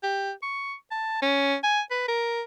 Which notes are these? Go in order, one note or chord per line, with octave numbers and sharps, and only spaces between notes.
G4
C#6
A5
C#4
G#5
B4
A#4